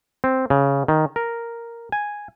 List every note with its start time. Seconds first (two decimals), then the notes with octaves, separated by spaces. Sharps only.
0.24 C4
0.50 C#3
0.88 D#3
1.16 A#4
1.92 G#5